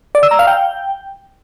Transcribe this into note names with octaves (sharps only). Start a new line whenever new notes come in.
D5
E6
A#5
F5
G5